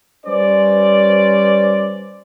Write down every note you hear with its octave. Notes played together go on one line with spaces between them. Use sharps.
G3 C#4 B4 C5 D5